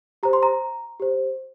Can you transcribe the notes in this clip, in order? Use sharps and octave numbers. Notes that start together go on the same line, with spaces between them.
G4 C5 A#5
C6
A#5
G4 C5